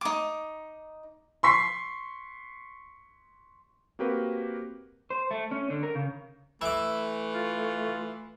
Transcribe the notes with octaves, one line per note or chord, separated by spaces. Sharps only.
D#4 D6
C6 C#6 B6 C7
A#3 C4 F#4 G4 A#4 B4
C5
A3
C#4
D3
A#4
C#3
E3 A3 E5 D6
F4